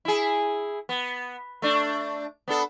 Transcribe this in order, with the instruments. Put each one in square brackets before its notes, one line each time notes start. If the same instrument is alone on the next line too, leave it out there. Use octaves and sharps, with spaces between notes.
[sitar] E4 G#4
B3
A3 D4
B3 D4 A4